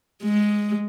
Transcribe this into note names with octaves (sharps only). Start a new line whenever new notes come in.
G#3